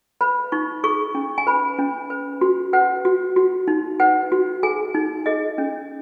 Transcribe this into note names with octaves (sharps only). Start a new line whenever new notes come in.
B4 B5
D#4 C#6
G#4 C#6
C#4
G#5
B4 B5
C#4
B4
F#4
B4 F#5
F#4
F#4
D#4
B4 F#5
F#4
G#4 G#5
D#4
G#4 D#5
C#4